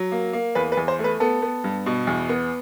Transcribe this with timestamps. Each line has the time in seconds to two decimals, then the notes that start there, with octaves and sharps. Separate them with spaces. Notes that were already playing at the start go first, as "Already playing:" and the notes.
Already playing: F#3
0.12 A#3
0.33 A#3
0.55 E2 B4
0.72 B4
0.77 E2
0.88 C5
0.99 A3
1.04 B4
1.20 B3 A4
1.42 B3
1.64 G2
1.86 B2
2.07 E2
2.29 B3